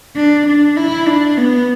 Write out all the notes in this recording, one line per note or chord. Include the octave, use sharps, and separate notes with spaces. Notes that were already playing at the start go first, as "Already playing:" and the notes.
D4
D4
E4
D4
B3